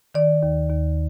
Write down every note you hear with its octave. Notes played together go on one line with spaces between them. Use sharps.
D#3 D5
D#2
D#2